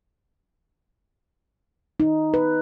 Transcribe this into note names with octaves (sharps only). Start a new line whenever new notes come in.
D#4
B4